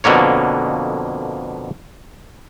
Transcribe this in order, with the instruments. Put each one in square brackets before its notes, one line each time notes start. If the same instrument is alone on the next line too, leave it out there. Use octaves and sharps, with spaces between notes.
[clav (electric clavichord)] F2 B2 D3 A#3 C#5